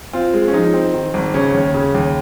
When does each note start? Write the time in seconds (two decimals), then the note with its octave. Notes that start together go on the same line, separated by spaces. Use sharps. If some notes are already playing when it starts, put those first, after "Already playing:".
0.13 C4 F4
0.33 G#3
0.48 C#4
0.53 F3 D#4
0.74 C4
0.94 D#3
1.14 G#1
1.34 C#3 C#4
1.54 D#2
1.74 C#3
1.94 D#2